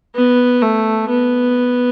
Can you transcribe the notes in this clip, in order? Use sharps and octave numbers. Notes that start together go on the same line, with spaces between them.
B3
A3
B3